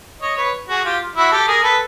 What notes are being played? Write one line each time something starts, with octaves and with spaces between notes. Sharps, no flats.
C#5 D#5
B4 C#5
F#4 G#4
F4 G4
E4 F#4
G4 A4
G#4 A#4
A4 B4